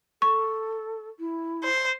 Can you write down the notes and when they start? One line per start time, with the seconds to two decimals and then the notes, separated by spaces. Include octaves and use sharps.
0.22 A4 C#6
1.19 E4
1.64 C5